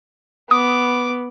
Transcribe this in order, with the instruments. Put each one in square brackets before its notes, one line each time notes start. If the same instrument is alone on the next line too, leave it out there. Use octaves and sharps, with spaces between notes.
[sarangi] B3 [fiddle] D6 [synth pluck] D#6